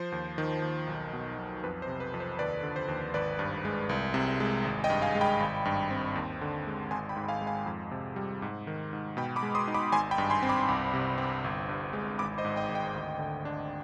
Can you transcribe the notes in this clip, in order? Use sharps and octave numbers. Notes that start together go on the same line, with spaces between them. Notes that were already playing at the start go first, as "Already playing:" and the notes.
Already playing: F3 C5
D#2
D#3
D#2
B1
B2
B1
F2 B4
C5
C3
B4
F2
C5
D#2 B4 D5
D3
C5
D#2
G#1 B4 D5
G2
G#3
C2
C3
G#3
G#1
D#5 G5
G2
F5 G#5
G#3
G5 B5
G#1
G2
C4
D#2
D3
G#3
G#1 G#5 C6
G5 B5
G#2
F5 G#5
G#3
F5 G#5
F2
C3
G3
G#2
D#3
G#2
B2 G5 B5
B5 D6
G#3
C6 D#6
D#4
B5 D6
G#1 G#5 C6
G5 B5
G2
G#5 C6
C4
B5 D6
C2
C3
C4
G1
G2
G#3
G#1 B5 D6
C5 D#5
G#2
D#5 G5
G#1
D#5 G5
D2
D3
D4